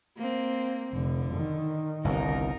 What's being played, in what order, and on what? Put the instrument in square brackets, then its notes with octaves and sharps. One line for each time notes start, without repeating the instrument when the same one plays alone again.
[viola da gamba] A#3 C4
[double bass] F1 [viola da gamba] D3
[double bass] D#3
[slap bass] G1 C2 [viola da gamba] D#4 A#4